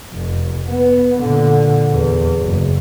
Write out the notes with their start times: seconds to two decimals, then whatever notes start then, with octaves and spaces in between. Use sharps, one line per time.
0.13 F1
0.69 B3
1.20 A#2 D3
1.92 E2
2.42 F#1